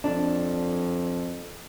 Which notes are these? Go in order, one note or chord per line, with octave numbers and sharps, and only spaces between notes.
F2 D4